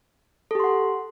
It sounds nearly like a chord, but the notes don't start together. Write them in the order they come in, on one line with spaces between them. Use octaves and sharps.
A4 G4 C6 F#5